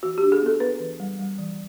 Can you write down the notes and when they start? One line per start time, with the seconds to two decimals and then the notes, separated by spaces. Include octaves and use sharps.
0.03 E3 F#4
0.18 G4
0.23 D4
0.32 G#4
0.42 B3 A4
0.60 B3 B4
0.80 E3
1.00 G3
1.19 G3
1.38 E3